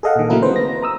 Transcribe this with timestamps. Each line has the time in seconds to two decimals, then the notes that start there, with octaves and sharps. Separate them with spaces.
0.03 G#4 A4 D#5 F5 F#5
0.16 A#2 D#3
0.30 C#3 F#3 A3 A#3 E4 A#4
0.43 C4 B4 C5
0.56 A#6
0.82 A#5 D#6 E6